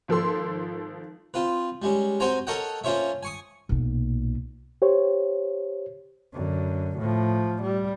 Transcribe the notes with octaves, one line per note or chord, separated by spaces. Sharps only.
G#1 F3 A4 C6
C4 F4 B4
G3 G#3 C#4
C4 F#4 C5 G5 G#5 A#5
A4 A#4 C#5 D#5 F#5 G5
A#3 C#4 F4 C5 C#5 E5
G#5 C#6 D#6
B1 A#2
G4 C5 C#5
F#2 D3
A2 F3
G3